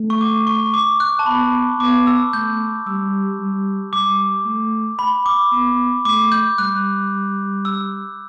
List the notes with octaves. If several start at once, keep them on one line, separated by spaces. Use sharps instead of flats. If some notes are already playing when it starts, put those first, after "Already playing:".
Already playing: A3
C#6
D6
C#6
D6
F#6
A5
B3 B5
B3 D6
E6
A3 G6
G3 E6
G3
G3 D6
A3
B5
D6
B3
A3 D6
G6
G3 F#6
E6